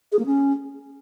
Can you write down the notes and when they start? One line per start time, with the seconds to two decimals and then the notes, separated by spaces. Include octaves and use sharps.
0.12 G#4
0.19 A#3
0.26 C#4